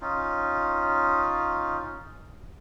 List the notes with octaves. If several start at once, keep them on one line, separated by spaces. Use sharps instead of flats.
C#4 D#4 F4